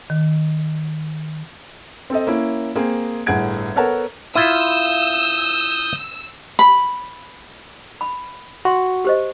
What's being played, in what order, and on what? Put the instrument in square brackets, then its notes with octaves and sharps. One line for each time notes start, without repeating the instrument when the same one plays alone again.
[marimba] D#3
[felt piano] C4 A4 D#5
A#3 C#4 E4
A#3 C4 G#4
G1 A2 G#4 F#5 G#6 D7
B3 A4 A#4 C#5 F#5 A5
[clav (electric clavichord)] E4 F4 [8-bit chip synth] D#6 G6 [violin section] E6
[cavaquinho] B5
[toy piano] B5
[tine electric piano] F#4 [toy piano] C6
[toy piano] G4 C5 D#5